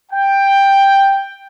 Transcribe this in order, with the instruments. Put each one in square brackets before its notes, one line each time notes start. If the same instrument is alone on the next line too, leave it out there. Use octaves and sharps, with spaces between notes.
[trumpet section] G5